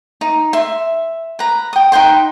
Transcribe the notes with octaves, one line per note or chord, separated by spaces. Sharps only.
D#4
E5 C6
B4 A#5
G5 D#6
D#4 B4 G5 C6